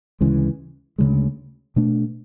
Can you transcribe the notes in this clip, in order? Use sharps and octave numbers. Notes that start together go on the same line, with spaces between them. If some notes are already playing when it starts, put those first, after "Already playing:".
D2 C#3 E3 G#3
D2 C#3 E3 G#3
B2 A3 D4